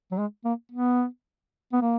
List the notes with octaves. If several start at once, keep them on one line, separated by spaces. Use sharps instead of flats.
F#3
G#3
A#3
B3
B3
A#3